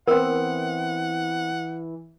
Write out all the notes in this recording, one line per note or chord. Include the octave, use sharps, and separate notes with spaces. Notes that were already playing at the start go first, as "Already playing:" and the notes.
E3 B3 C4 A#4 F#5